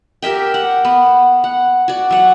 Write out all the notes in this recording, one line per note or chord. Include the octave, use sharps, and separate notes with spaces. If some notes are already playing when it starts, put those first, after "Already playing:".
G4 A#4 E5 G5
F#5
B3
F#5
F#4 D5
F#3 F#5